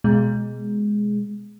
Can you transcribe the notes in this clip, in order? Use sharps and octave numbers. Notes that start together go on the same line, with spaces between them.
B2 G#3